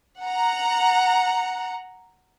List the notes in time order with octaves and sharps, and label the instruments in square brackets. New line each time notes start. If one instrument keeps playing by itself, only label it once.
[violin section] F#5 A#5